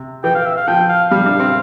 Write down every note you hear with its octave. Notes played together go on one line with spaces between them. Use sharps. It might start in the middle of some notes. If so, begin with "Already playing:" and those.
Already playing: C3
E3 G5
F5
E5
F5
F3 G5
F5
G3 F5
D4
C4